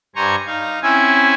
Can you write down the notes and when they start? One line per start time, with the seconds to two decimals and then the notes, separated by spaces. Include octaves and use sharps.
0.16 G2 C5 G#5 A#5 C#6
0.46 D#4 F5
0.83 C4 C#4 E4 E5 G#5